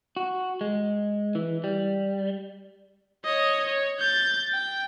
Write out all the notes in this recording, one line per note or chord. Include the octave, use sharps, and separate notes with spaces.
F#4
G#3
E3
G3
C#5 D#5
C#5
G6 A6
G5